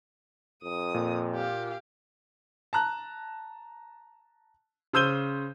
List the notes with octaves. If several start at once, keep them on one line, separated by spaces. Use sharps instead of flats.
F2 D#6
A#2
G4 F5
A5 A#5 F#6
C#3 C5 E6 G6 D#7 G7